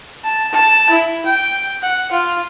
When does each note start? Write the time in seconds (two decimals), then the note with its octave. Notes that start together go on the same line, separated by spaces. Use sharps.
0.24 A5
0.53 A5
0.90 E4
1.26 G5
1.82 F#5
2.12 F4